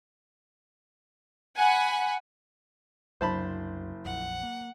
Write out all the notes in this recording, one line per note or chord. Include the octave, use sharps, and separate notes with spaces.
F#5 G#5 B5
F#1 C2 F#2 D4 C5 A5 B5
A#1 F2 F#5
A#3